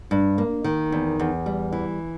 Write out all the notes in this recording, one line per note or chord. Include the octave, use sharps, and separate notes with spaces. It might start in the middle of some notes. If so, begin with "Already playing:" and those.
G2
A#3
D#3
E2
E2
G3
E3